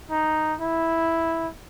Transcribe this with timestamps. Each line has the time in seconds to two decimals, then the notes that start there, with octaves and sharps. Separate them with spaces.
0.11 D#4
0.60 E4